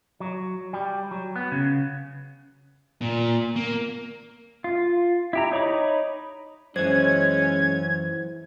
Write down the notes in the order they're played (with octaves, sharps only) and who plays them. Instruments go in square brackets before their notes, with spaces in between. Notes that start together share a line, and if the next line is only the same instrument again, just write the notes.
[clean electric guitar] F#3
G3
F#3
B3
C#3
[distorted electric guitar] A#2
A#3
[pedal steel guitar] F4
E4 G4 A#5
D#4 C#5 B5 D6
[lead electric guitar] F#2 E3 [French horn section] G#3 C#4 [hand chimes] C5 [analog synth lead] G#6